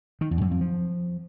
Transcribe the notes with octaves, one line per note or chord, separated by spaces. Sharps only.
D#3
E2
F#2
F2
F3